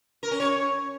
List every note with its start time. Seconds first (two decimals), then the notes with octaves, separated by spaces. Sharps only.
0.23 A#4
0.31 C#4
0.40 C#5